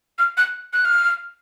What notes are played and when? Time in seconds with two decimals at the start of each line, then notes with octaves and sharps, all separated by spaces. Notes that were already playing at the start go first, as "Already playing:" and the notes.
0.18 F6
0.37 F#6
0.73 F#6
0.85 F6